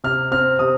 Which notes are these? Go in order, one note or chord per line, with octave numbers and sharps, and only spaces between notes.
C3 F6
C4 F6
C3 D#6